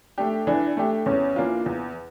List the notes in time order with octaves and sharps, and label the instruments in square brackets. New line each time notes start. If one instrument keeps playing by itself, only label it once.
[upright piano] A3 D4 G4
[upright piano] E3 [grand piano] D4
[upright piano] A3 D4 G4
[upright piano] E2 [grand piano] C#4
[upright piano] E3 A#3 D4 F4
E2